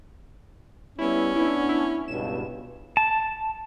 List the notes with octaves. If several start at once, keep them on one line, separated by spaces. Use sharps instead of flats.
G3 B3 C#4 E4
B3 D4 E4
E4
C#2 G2 B2 E7
A5